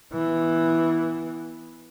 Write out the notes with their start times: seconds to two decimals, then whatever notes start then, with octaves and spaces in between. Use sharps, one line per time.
0.12 E3 B3